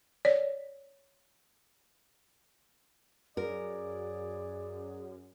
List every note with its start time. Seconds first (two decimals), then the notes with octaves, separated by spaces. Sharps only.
0.25 C#5 D5
3.37 F#2 G#4 A#4 D5